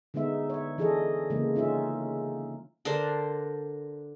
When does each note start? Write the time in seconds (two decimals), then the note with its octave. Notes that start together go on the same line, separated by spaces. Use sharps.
0.14 D3 G#3 B3 D#4 E5
0.50 C#5 E5
0.78 E3 D4 G#4 A4 D#5
1.30 C#3 E3 G#3 A#3
1.56 C#4 D#4 F4 E5
2.85 D3 D4 A#4 C5